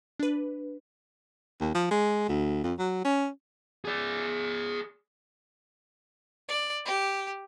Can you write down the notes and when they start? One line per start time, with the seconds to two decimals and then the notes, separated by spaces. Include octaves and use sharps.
0.19 D4 B4
1.60 D#2
1.75 F3
1.91 G#3
2.28 D2
2.63 F2
2.79 F#3
3.04 C#4
3.85 G#4 D5
6.48 D5
6.85 G4